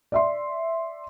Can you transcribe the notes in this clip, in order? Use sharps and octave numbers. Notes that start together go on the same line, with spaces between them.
D5 E5 C6